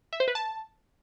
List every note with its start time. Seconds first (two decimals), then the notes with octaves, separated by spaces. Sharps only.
0.13 E5
0.20 C5
0.28 B4
0.35 A5